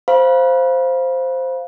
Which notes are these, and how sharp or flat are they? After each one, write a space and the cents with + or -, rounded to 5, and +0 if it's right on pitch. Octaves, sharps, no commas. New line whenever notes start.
C5 +0 F5 +0 B5 -35